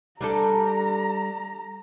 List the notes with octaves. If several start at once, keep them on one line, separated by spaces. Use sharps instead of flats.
G3 D4 A4 A#5